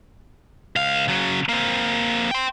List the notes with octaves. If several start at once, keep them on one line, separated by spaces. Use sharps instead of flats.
C#2 F5
C#3 F#3
A#3 C4
G5 C6